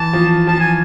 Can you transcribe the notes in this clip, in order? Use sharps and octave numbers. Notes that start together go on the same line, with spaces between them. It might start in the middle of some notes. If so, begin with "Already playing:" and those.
Already playing: E3 A5
F3
F3 A5
G#5